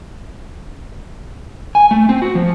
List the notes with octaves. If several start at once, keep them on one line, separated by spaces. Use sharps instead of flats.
G#5
A3
C4
F#4
F3